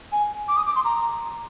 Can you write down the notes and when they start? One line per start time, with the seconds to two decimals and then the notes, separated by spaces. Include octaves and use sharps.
0.12 G#5
0.48 D6
0.57 D#6
0.66 D6
0.76 C6
0.85 A#5